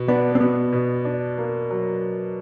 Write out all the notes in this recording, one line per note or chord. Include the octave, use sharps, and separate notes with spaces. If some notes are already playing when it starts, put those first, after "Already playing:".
Already playing: B2
B3 D4
C4
B2 B3
B2
D4
A#3
F#3